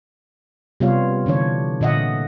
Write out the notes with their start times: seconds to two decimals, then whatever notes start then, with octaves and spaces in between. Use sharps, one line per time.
0.80 C3 G3 B3 F4 C#5 F5
1.26 D3 E3 D4 C#5
1.81 A#2 D3 D#5 E5 F#5